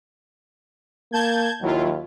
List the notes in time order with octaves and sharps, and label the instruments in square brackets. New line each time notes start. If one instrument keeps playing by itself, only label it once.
[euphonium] A#3 [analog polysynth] A5 G6 G#6
[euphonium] D#2 [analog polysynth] F#3 E4 F4